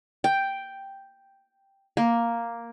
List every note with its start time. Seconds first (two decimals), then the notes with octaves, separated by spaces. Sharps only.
0.24 G5
1.97 A#3